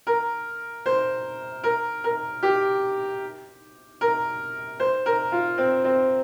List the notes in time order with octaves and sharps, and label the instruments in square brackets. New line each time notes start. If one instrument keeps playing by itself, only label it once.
[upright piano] A#4
C5
A#4
A#4
G4
A#4
C5
A#4
F4
C4
C4